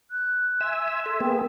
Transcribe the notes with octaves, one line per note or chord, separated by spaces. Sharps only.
F#6
E5 G#5 C6 E6
A4 E5
A#3 B3 G#4 G5